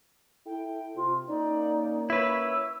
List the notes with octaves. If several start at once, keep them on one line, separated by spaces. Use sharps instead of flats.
E4 A4 G5
C3 F4
A#3 C#4 D#4 D5
E4 B4 C#5 E6